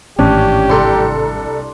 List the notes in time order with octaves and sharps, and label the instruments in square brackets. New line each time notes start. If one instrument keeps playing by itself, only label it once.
[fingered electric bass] G#1 A2 E3 [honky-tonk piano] C#4 [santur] D4 [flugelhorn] G4
[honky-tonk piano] C2 A4 A#5 [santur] C6